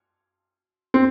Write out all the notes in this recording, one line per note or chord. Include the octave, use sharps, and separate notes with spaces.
C4